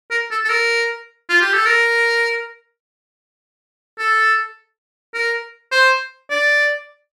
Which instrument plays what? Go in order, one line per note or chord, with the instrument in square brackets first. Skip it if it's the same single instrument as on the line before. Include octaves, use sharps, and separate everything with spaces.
[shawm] A#4
A4
A4
A#4
F4
G4
A4
A#4
A4
A#4
C5
D5